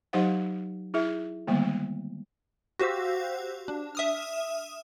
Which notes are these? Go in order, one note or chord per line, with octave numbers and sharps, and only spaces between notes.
F#3 D#4 G4 C5 F5 F#5
E4 G#4 E5
D3 D#3 G3 G#3 A#3 B3
F#4 G4 C5 F5 E6
D4
E5 D#6 F6